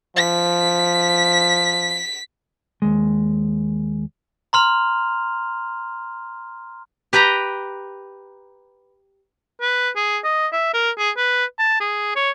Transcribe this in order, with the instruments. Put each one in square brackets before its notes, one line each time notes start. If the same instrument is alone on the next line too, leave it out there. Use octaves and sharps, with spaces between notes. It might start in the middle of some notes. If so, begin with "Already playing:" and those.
[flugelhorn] F3 [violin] B6
[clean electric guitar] D#2 G#3
[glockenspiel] A#5 C6 F6 F7
[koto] G4 B4 G5 A#5
[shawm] B4
G#4
D#5
E5
A#4
G#4
B4
A5
G#4
C#5